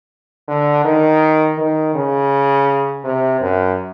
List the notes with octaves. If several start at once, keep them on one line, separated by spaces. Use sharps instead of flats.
D3
D#3
D#3
C#3
C3
F#2